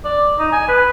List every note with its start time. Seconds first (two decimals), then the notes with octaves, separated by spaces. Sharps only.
0.05 D5
0.39 D#4
0.52 G#5
0.68 B4